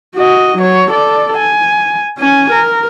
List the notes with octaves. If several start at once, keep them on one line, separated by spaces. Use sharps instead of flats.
F#4 D#5
F#3 C#5
A4 D5
G#5
C#4 G#5
A#4